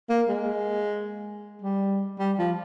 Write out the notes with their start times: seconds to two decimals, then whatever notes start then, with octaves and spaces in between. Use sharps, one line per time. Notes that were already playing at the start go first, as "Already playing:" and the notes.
0.09 A#3
0.29 G#3
1.62 G3
2.19 G3
2.38 F3